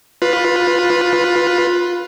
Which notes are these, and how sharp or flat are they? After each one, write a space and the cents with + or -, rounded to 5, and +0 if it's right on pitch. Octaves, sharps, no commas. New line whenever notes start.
F4 +15 B4 +0